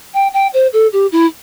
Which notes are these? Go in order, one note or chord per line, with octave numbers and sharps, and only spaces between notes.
G5
G5
C5
A4
G4
E4